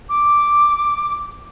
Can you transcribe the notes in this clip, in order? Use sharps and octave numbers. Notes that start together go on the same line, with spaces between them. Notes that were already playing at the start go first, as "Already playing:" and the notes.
D6